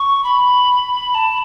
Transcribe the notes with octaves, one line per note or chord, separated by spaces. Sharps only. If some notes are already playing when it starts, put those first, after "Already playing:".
Already playing: C#6
B5
A5